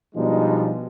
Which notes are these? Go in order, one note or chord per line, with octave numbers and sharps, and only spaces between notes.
B2 F3 G3 G#3 D4 D#4